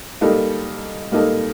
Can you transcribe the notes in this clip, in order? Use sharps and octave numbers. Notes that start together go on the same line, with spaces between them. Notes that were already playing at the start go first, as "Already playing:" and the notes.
G3 A#3 D#4 A4
G3 A#3 D#4 A4